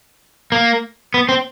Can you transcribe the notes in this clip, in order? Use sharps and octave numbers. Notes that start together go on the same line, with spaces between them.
A#3
B3
C4